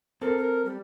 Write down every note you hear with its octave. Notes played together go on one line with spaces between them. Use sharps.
C4 A4 A#4
A#4
G3